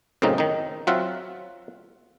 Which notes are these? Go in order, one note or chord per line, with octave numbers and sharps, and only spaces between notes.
F#2 A2 C#3 C4 D#4
D#3 D#4
F#3 C4 F4 E5 F#5